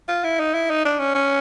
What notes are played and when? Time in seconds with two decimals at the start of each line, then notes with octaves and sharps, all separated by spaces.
0.08 F4
0.24 E4
0.40 D#4
0.54 E4
0.70 D#4
0.85 D4
1.00 C#4
1.15 C#4